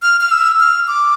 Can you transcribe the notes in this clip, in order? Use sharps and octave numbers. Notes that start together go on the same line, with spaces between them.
F6
F6
E6
F6
D6